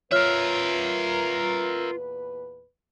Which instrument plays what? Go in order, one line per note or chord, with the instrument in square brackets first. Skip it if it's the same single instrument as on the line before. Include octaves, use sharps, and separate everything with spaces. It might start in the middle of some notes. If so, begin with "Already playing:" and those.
[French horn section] E2 A#2 B4 [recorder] F4 [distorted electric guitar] A#4 E5 [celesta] C#5 F6